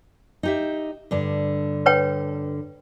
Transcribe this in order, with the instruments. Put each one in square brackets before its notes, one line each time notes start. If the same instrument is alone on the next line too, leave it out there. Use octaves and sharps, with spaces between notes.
[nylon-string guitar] D#4 G4 E5
G2 D3
[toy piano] B4 C#5 G5